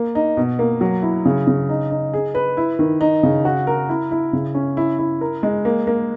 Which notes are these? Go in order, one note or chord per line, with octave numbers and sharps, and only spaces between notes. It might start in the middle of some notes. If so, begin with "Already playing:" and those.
Already playing: A#3
D#4
B2
A#3
F#3
E4
C#3
C#3
D#4
D#4
G#4
B4
E4
D#3
D#4
C#3
F#4
A#4
E4
E4
C#3
C#4
E4
E4
A#4
G#3
A#3
A#3